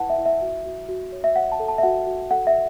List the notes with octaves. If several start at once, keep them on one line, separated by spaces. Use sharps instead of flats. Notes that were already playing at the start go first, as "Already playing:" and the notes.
Already playing: E4 B4 F#5 A5
E5
E4
E5
F#4
F#4
F#4
C#5
E5
C#5 F#5
A5
A4
A5
E5
F#4 F#5
F#4
A4 F#5
E5